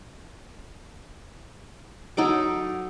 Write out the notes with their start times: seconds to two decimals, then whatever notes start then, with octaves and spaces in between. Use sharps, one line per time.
2.17 F#3 D#4 A4 D6